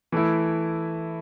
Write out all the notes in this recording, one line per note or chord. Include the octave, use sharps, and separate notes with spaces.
E3 A3 E4